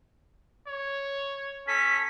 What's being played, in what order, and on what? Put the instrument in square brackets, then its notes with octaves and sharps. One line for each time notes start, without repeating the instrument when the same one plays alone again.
[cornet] C#5
[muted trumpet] C#4 [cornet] A4 [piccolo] B6